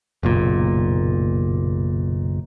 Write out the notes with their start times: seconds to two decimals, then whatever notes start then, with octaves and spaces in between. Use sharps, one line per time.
0.23 F#1 B1 A#2